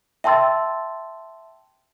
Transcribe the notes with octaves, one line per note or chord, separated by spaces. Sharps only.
E5 G5 A5 C6 E6 A6